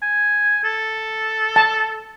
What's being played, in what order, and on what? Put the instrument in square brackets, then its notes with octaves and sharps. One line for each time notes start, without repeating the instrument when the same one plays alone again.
[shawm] G#5
A4
[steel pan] A5